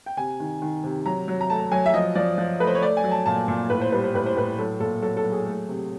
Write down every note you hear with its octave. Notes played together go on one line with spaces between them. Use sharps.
G5
C3 G#5
D#3
D#3
C3
F#3 A#5
F#3
A#5
A3 A5
F#3 G#5
E5
F3 D#5
F3 D5
F3
A3 B4
C5
C#5
A3 D5
G#5
F#3
A5
A#2 A5
A#2
A2 B4
C5
G3 B4
C5
A2 B4
C5
A2 B4
F#3 A4
A#2 A4
F#3 A4
A4
F#3
G#4
A3
C3